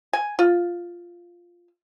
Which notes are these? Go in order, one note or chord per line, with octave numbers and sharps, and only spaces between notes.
G#5
F4